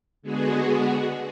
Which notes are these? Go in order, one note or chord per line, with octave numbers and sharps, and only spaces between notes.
D3 G#3 B3 F#4 G#4